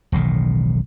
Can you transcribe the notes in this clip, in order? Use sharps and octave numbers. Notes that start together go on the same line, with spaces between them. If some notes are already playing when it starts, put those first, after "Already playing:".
E1 B1 A2 D#3